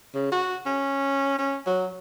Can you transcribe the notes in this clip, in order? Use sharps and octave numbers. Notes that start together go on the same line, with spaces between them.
C#3
F#4
C#4
C#4
F#3